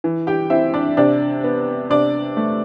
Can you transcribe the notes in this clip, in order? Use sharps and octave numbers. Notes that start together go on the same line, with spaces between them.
E3
G4 G5
C4 E4 E5
D4 D5
C3 D4 D5
B3
C3 D4 D5
A3